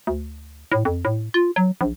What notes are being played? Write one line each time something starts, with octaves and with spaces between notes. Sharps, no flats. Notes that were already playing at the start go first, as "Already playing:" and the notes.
D2
A2
F2
A2
F4
F#3
A#1